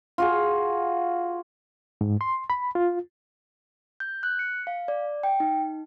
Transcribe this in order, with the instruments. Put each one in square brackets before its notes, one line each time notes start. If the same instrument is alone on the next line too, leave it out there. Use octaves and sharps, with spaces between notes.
[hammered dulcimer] F4 F#4 G#4
[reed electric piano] G#2
C6
B5
F4
[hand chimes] G6
F#6
C#7
F5
D5
G5
D#4